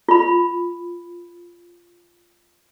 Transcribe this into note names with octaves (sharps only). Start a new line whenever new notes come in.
F4 B5